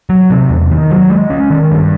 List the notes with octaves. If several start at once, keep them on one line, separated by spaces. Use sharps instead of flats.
F#3
C3
E2
D#3
F#3
G#3
C#4
D#3
G2